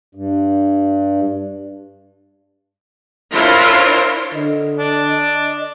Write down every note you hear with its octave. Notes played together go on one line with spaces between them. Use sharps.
G2
D4 E4 F4 A#4 C5 C#5
D3 D#5
D4